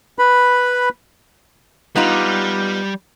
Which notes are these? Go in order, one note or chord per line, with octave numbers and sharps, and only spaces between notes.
B4 B5
G3 B3 D#4 F4